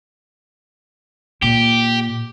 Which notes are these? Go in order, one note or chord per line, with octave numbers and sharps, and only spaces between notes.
A#2 G4